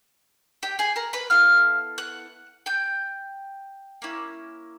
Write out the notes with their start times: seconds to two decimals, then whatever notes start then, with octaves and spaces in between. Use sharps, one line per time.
0.63 G4 G5
0.79 G#4 G#5
0.96 A#4 A#5
1.13 B4 B5
1.30 B3 E4 A4 F5 F6
1.98 F#5 F#6
2.66 G5 G6
4.02 A#3 C#4 E4